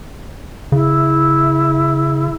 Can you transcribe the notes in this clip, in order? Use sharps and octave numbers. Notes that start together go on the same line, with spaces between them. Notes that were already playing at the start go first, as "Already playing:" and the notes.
C#3 E4